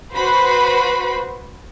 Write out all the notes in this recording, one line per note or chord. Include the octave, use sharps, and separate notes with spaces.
F#4 B4 C5 B5